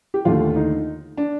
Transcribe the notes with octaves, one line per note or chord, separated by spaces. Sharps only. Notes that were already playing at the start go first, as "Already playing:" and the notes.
G4
D#2 D3 A3 F4
D#4
D4